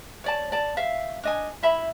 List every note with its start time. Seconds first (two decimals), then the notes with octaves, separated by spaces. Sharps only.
0.24 C#5 D5 A5
0.52 D5 A5
0.77 E5 F5
1.23 D4 D#5 G#5
1.63 E4 E5 B5